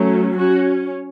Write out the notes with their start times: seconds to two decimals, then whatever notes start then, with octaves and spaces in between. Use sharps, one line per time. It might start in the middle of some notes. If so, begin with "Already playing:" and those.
Already playing: F#3 A3 C#4
0.37 C#4 F#4